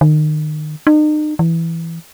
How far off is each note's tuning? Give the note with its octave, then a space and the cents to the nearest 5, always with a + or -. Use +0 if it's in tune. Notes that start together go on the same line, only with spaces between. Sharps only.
D#3 -30
D#4 -40
E3 +5